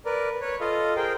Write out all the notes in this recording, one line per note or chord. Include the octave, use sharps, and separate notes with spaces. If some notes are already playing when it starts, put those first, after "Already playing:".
A#4 B4 D5
B4 C#5
F4 A4 D#5 F5
G#4 A#4 C5 G5